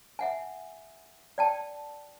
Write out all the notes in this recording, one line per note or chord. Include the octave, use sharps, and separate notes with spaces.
E5 F#5 G#5
D5 G5 A5